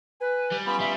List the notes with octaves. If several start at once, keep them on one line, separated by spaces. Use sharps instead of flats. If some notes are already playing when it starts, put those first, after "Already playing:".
B4 G#5
G3
B3 C#4 F4 B5
G3 E5